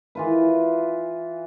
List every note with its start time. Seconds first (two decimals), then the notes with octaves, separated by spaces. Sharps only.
0.15 E3 F4 B4